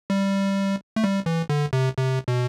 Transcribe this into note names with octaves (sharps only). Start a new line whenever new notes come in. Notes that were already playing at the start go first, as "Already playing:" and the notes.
G3
A3
G3
E3
D3
C3
C3
B2